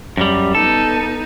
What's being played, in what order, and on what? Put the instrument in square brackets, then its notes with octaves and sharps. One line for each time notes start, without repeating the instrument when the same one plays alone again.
[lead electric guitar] F#2 G3
[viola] B3 D#4 [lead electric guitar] A4